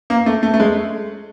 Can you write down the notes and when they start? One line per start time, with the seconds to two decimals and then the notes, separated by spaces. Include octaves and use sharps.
0.10 A#3
0.26 A3
0.43 A3
0.54 A3
0.60 G#3